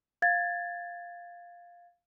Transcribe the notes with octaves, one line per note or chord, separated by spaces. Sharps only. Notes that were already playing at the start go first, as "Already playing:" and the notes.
F5 G#6 A6